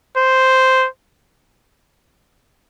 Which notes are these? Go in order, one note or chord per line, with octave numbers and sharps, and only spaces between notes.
C5